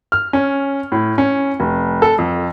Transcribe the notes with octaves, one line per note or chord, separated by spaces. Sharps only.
F6
C#4
A2
C#4
F1
A4
F2